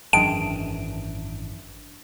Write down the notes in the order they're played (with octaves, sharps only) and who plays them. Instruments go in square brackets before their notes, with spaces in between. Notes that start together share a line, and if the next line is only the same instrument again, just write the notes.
[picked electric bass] G#1 D4 [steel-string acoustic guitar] F#2 E3 [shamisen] G#3 G5 A5 [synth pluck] D7